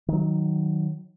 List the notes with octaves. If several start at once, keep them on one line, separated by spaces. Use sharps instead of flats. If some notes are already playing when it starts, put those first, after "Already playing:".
D#3 F#3